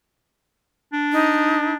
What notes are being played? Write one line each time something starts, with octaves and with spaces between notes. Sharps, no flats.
D4
D#4